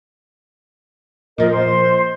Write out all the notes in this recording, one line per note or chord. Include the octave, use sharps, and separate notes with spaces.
A#2 F3 A#4 D#5
C5 C6